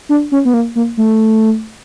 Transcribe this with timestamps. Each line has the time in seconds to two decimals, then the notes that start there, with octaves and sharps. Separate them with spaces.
0.09 D4
0.32 C#4
0.45 B3
0.54 A#3
0.76 A#3
0.97 A3